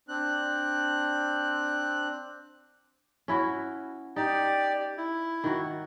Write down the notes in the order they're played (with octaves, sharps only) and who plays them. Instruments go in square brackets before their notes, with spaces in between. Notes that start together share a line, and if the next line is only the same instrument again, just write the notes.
[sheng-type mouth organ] C4 D4 F#6
[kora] C#4 E4 F#4
[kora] D#4 [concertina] G4 D5
[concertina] E4
[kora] D#3 F#4